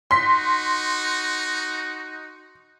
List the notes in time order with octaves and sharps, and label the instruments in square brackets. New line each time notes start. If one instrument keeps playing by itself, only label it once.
[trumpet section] D#4 F#4 [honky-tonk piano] C6 B6